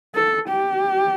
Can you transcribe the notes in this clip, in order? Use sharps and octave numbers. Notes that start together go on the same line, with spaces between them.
A4
G4